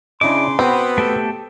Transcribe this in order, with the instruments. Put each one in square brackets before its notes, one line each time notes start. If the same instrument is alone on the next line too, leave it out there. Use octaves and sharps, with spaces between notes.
[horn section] C#3 C6 [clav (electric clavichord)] D4 E4 D#5 [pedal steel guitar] D6
[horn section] B3 [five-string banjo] C4 [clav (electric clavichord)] F#4 B4 G5
[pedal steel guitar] A3 G4 A4